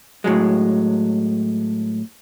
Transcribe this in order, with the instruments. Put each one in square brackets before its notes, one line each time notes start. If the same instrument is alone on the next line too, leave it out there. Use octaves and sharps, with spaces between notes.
[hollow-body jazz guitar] A2 F#3 G#3